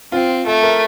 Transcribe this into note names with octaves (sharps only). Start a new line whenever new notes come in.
C4 F4
A3 A4
A#4